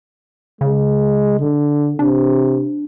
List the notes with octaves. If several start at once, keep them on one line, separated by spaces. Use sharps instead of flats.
C#3 G#3
D3
C3 D4